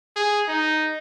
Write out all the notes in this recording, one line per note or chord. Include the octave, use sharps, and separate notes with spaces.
G#4
D#4